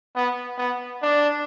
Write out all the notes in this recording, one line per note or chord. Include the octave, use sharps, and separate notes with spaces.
B3
B3
D4